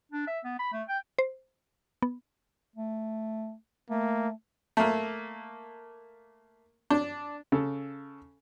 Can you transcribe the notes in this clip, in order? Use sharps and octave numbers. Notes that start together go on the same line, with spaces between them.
D4
E5
B3
B5
A3
G5
C5
B3
A3
A3 A#3
A3 A#3
D4
C#3 A4